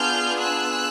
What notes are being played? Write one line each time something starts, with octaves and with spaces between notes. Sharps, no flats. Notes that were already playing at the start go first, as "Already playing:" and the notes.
Already playing: B3 D4 F4 G#4 F6 G6
E6 F#6